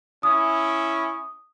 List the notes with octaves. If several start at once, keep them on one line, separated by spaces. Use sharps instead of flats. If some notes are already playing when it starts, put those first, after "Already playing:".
C#4 E4 D#6